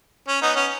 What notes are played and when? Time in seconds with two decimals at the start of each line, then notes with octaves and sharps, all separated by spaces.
0.28 C#4
0.42 B3 D#4
0.56 C#4